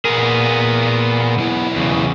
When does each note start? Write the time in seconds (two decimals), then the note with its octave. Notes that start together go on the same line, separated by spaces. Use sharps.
0.05 A#2 B3 G#4 A#4
1.38 B1 E4
1.76 E2 C#3